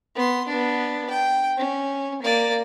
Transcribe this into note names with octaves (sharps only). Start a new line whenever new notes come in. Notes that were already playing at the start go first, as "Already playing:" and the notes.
B3 C6
B3 D4
G5
C#4
A#3 D5